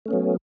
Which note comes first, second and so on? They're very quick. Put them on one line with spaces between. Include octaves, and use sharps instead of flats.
A3 C#4 B3 F#3